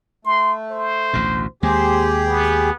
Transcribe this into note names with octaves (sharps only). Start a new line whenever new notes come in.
A3 C6
C5
A1 D2 B2
D#2 G#3 A#3 G4 G#4 C5
B3